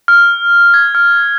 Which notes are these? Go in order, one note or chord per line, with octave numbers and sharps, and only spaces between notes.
F6
G#6
F6